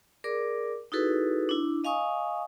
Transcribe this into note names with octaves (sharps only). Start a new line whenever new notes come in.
G#4 A#4 D5 D6
D#4 E4 F#4 G#4 A4 B4
D4 E4
D#5 F5 G#5 C#6 D#6